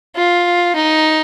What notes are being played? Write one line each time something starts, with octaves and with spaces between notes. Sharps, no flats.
F4
D#4